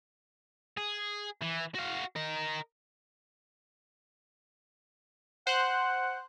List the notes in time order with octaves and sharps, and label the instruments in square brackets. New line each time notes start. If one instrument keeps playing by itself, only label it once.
[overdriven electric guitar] G#4
E3
F#4 F5
A#4 D#5
[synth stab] C5 F#6 [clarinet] F#5